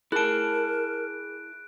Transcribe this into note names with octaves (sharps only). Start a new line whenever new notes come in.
E4 G#4 A#4 A5 F#6 D7